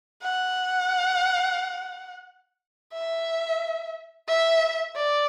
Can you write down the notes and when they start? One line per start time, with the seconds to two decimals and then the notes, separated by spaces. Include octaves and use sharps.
0.22 F#5
2.93 E5
4.28 E5
4.96 D5